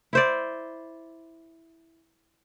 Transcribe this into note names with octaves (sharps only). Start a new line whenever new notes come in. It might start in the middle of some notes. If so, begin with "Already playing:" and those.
E4 C5 D5